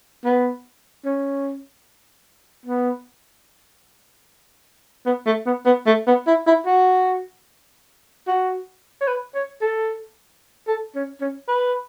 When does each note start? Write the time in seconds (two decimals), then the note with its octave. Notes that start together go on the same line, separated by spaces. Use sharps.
0.25 B3
1.05 C#4
2.66 B3
5.06 B3
5.26 A3
5.46 B3
5.66 B3
5.86 A3
6.07 B3
6.27 E4
6.47 E4
6.66 F#4
8.28 F#4
9.01 C#5
9.07 B4
9.35 C#5
9.61 A4
10.67 A4
10.95 C#4
11.21 C#4
11.48 B4